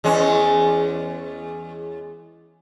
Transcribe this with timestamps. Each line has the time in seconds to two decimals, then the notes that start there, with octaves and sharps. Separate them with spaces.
0.04 E2 G#3 C#4